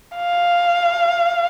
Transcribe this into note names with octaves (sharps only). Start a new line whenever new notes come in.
F5